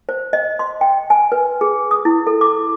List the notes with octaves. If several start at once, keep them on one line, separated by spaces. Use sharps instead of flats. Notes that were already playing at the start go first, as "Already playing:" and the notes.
C5
D#5
C6
G5
G#5
B4
G#4
D#6
E4
A4
D6